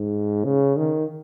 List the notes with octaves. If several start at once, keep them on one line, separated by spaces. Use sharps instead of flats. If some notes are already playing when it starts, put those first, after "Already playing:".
Already playing: G#2
C#3
D#3